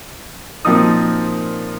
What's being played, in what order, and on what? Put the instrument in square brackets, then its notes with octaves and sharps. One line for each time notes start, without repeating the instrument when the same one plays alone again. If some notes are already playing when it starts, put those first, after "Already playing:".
[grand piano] A#2 F3 C4 D#4 D#6